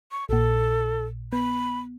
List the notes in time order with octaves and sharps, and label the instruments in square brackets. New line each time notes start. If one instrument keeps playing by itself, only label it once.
[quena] C#6
[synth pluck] A#1 A#2 [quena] A4
[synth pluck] B3 [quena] B5